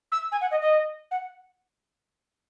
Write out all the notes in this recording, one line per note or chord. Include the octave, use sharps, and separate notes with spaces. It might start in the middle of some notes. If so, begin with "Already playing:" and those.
E6
G#5
F#5
D#5
D#5
F#5